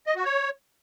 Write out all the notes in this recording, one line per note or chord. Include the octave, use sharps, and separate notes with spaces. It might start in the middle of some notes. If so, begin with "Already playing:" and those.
D#5
F#4
C#5